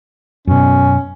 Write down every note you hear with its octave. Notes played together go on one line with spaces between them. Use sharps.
F#2 B2 C#4